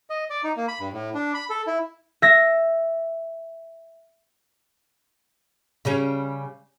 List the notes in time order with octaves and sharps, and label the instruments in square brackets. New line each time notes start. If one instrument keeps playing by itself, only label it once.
[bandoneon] D#5
D5
D#4
A#3
B5
G2
A2
D4
B5
A4
E4
[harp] E5 A#6
[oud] C#3 G3 C#4